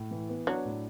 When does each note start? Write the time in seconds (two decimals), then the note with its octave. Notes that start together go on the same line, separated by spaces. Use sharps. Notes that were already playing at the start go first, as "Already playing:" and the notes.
Already playing: A2
0.11 E3
0.29 B3
0.47 F#3 D4
0.65 A2